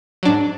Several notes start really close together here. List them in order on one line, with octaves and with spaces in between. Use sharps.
F#3 D4 G#2